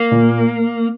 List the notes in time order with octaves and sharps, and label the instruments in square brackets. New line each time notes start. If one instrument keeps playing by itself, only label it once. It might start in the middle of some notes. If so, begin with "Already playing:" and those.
Already playing: [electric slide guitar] A#3
[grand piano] A#2